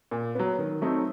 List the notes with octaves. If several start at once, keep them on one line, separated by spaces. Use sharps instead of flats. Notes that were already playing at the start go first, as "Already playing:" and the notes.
A#2
F#3 B3
D#3
F#3 A3 C4 D#4